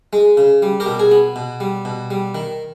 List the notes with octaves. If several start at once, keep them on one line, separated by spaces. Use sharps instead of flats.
G#3
C#3
G3
G4 A#4
B2
G#4
B3
B2
G3
B2
G3
D#3